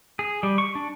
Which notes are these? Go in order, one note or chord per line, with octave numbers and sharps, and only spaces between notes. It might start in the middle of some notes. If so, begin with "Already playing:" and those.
G#4
G3
C#6
D4